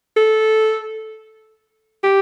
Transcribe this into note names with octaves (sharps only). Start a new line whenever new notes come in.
A4
G4